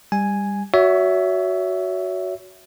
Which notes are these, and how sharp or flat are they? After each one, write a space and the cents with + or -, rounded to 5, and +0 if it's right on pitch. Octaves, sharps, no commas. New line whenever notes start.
G3 +25 G#5 +0
F#4 +0 C#5 +30 E5 +0